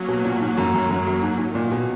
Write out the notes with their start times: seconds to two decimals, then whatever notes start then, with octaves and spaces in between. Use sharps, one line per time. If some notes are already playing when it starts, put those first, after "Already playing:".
Already playing: F#3 A#3 C#4
0.08 B2
0.25 A#2
0.41 G#2
0.57 F#2
0.74 F#2
0.89 F#2
1.07 F#2
1.23 G#2
1.38 G#2
1.55 A#2 D#3 F#3 C#4
1.72 B2